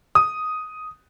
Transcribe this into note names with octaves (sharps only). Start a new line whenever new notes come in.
D#6